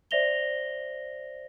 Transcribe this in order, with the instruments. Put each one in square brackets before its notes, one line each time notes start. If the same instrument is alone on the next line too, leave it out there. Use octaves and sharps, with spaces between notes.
[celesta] C5 D5 E5 A#6 F7 G7